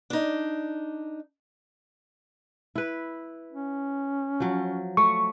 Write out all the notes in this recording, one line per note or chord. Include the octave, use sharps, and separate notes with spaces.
D4 D#4
E4 B4
C#4
F3 F#3
A3 C#6